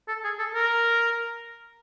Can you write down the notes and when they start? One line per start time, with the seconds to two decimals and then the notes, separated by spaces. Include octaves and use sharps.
0.08 A4
0.24 G#4
0.39 A4
0.55 A#4